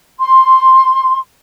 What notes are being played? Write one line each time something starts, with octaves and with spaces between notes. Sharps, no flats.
C6